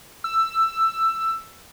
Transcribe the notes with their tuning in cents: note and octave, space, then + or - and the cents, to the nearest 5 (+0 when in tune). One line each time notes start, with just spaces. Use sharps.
E6 +10